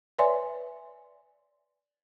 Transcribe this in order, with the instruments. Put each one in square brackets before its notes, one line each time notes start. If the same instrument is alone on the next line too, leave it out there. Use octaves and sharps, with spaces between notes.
[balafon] B4 C#5 D5 E5 G#5 C6